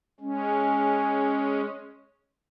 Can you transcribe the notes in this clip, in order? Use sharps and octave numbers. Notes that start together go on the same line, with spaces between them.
G#3 C#4